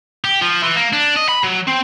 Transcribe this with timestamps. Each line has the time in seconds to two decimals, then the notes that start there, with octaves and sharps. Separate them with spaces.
0.24 G4
0.41 F3
0.63 E3
0.76 A#3
0.93 D4
1.16 D#5
1.29 B5
1.44 F#3
1.68 C4